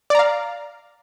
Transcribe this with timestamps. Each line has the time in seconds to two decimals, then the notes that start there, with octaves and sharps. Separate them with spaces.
0.10 D5
0.15 A#5
0.19 F5